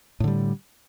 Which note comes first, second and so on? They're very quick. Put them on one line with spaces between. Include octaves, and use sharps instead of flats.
A2 D3 G3